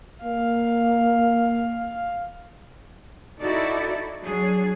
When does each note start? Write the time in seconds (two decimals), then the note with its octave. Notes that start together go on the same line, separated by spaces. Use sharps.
0.24 A#3 F5
3.41 D#4 E4 F#4 A4 D5
4.23 F#3 D4 G#4